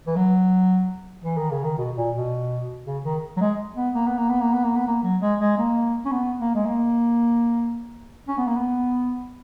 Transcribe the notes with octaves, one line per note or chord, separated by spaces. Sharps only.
E3
F#3
E3
D#3
C#3
D#3
B2
A#2
B2
C#3
D#3
F#3
G#3
B3
A#3
B3
A#3
B3
A#3
B3
A#3
B3
A#3
F#3
G#3
G#3
A#3
C#4
B3
A#3
G#3
A#3
C#4
B3
A#3
B3